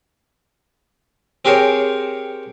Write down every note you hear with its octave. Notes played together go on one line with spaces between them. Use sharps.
C4 G4 G#4 A#4 C5 C#5